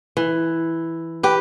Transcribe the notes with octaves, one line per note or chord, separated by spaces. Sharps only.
E3
G4 B4